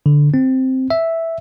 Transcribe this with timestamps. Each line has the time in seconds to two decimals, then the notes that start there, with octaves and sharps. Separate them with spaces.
0.06 D3
0.34 C4
0.90 E5